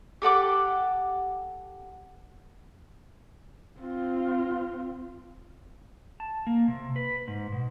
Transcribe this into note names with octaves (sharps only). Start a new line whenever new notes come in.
G4 A4 F#5 D6
C4 F4
A5
A#3
C3
B4
G#2
B2